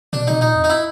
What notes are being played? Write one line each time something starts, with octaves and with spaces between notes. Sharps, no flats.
B2 D4
B2 D#4
A#2 D#4
F2
D#4
E4